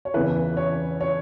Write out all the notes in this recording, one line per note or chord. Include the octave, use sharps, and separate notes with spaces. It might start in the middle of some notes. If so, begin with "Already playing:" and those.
C#5
E2 C#3 E3 B4
C#5
C#5